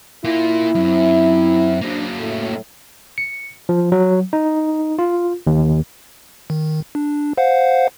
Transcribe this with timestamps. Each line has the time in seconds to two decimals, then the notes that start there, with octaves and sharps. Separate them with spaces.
0.24 A#3 E4 F4
0.75 F#2 C4 E5
1.82 F#3 A#3 D4 C5
2.18 A2
3.18 C#7
3.69 F3
3.92 F#3
4.33 D#4
4.99 F4
5.47 D#2
6.50 D#3
6.95 D4
7.37 C5 F5 F#5